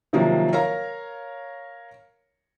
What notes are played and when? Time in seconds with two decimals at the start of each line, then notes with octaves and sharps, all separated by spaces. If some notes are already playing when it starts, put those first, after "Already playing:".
0.13 C3 D#3 F3 F#3 A#3
0.53 A#4 C#5 F5 A#5